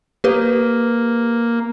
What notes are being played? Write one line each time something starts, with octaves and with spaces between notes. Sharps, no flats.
A#3 G4 B4